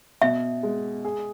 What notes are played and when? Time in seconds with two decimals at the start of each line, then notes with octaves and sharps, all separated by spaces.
0.22 B2 E5
0.63 G#3
1.05 G#4